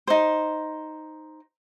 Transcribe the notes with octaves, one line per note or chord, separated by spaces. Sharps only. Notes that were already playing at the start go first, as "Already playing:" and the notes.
D#4 C5